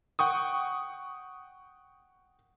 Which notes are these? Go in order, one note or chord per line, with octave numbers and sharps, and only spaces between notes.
F#5 G5 C#6 D#6